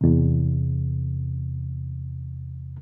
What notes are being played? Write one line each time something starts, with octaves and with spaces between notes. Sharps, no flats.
E2 C3